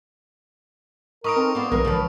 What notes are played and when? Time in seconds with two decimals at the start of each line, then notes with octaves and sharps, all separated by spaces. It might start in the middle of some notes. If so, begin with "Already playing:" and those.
1.24 D#4 A#4 B5 C#6 D#6 D7
1.37 C4 A4 A#4
1.55 B3 C4 D5 F5 D6
1.72 B1 G2 E3 F#3 G#3 A#4
1.85 C#2 D3 F3 F#3 B4